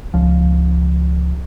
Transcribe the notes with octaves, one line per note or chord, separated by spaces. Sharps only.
C#2 F3